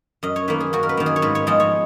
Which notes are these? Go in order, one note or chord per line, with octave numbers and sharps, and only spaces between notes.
F#2 D#5
C#5
D#3 A#3 B4
G#4
F#2 F#4
A#4
B4
D#3 A#3
G#4
C#5
G#2 B4
C#5
F3 G#3 B3 D#5
C#5